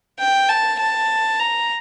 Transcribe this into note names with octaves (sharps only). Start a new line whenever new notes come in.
G5
A5
A5
A#5